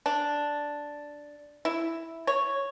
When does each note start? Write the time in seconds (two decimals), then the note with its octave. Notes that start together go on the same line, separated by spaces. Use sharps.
0.06 D4
1.65 E4
2.27 C#5